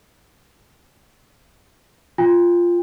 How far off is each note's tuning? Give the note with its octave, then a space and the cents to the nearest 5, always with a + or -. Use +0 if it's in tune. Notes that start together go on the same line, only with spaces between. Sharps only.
F4 -5 G5 +40